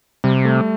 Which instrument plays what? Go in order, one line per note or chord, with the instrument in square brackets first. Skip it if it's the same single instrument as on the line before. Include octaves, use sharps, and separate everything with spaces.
[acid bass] C3 [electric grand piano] G3
[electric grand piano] A3